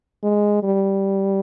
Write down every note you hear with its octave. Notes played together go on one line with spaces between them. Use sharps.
G#3
G3